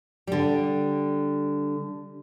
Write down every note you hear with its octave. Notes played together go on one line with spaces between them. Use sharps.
D3 G3